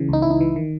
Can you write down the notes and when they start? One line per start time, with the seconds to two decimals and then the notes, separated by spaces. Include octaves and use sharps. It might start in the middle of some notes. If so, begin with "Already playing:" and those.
Already playing: C#3 E3
0.08 C#2 D#4
0.22 C#2 E4
0.30 D#4
0.41 E3
0.56 D#3